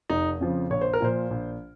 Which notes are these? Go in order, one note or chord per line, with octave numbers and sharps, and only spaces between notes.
F1 D#4
F2 C#3 F3
A#1 C#5
C5
A#4
A#2 F3 C5
A#1